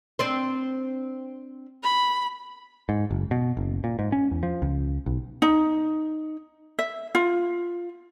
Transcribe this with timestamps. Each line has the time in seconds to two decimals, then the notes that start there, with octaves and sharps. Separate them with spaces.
0.19 C4 D4 C5
1.83 B5
2.89 G#2
3.11 F#1
3.31 B2
3.57 F#1
3.84 A#2
3.99 G#2
4.12 C#4
4.31 E2
4.43 F3
4.62 C#2
5.06 B1
5.42 D#4
6.79 E5
7.15 F4